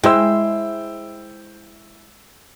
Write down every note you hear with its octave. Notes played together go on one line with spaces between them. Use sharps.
G#3 E4 C5 E5 G5 E6